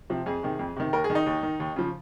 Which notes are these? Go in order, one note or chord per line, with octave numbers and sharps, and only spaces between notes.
C3 F3
F2 G#4
C3 D#3
F2
C3 D#3
D#2 A#4
G#4
D#3
D#4
D#2
D#3
D#2
C#3 F3